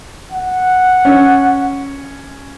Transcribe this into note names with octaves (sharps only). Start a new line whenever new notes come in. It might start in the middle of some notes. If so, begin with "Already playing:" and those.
F#5
C#4